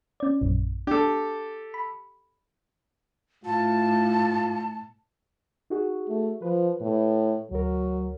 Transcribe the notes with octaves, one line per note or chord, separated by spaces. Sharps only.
C#4 D5
A#1 F#2
D4 G4 A4
B5
A2 F4 A5
D#4 F#4 G#4
A3
F3 B4
A2
D2 F#3 A#4